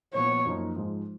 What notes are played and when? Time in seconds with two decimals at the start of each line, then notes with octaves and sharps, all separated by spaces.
0.14 A#2 F3 B3 C#5
0.46 F#2 F3 A#3 D#4
0.76 G#2 F3 G#3